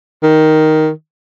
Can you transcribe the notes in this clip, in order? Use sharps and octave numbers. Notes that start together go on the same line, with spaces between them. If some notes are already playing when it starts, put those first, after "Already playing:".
D#3